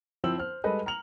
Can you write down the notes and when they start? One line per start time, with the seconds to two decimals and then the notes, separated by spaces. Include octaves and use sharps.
0.24 F3 C4 E4 E6 F#7
0.38 C5 F6
0.64 G3 G#3 A4 B4 D#5
0.86 A#5 F6 F7 F#7